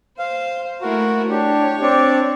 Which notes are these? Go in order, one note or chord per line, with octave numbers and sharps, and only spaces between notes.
C5 F5
A3 E4 F#4 A#4
D4 G4 C#5
C4 D4 D5